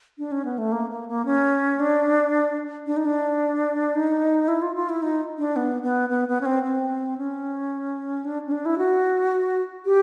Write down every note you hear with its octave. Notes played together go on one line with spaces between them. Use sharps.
D4
C#4
B3
A3
A#3
A#3
A#3
C#4
D4
D4
D#4
D4
D#4
E4
F4
F4
E4
D#4
D4
B3
B3
B3
B3
C#4
C4
C4
C#4
D4
C#4
D4
E4
F#4
G4